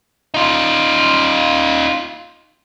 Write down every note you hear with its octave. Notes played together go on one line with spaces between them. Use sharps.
D#4 F4